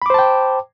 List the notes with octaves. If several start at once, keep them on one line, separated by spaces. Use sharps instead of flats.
C5 G5 A5 B5 D6